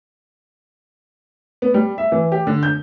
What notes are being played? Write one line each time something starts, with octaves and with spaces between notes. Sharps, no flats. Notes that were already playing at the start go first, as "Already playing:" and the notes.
B3
G3
E5
E3
G4
D3
G6